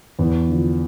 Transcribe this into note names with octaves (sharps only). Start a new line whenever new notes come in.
E2
D3 F3